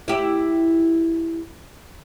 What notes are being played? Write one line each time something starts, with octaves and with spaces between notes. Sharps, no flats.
E4 G4